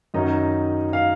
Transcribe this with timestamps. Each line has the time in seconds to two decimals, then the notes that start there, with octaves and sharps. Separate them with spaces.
0.14 F#2 D#3 F#3 C#4 D#4 D#5
0.93 F5